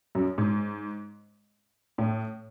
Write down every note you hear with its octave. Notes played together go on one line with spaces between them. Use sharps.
F#2
G#2
A2